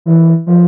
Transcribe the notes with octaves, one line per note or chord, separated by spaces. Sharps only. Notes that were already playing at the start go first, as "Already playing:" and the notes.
E3
F3